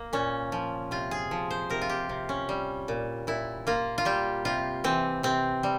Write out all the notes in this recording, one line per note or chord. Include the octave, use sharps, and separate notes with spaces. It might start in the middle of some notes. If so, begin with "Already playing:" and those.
Already playing: A#3
A#2 C#4
F3
C3 F4
G#4
F3
C5
C3 A#4
F4
G4
C3
C#4
G3
A#2
A#2 E4
A#3 F4
F4
G3 G4
C3 F4
E3 C4
C3 C4
G3